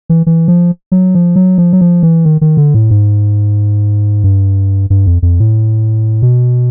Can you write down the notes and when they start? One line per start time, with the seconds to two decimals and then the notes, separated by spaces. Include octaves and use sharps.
0.09 E3
0.26 E3
0.48 F3
0.92 F#3
1.15 F3
1.36 F#3
1.58 F3
1.73 F#3
1.81 F3
2.03 E3
2.25 D#3
2.41 D#3
2.57 D3
2.74 A2
2.91 G#2
4.24 G2
4.90 G2
5.06 F2
5.22 F2
5.40 A2
6.22 B2